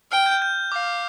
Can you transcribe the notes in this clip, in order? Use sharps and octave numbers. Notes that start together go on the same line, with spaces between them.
G5 F6
G6
G6
F5 D6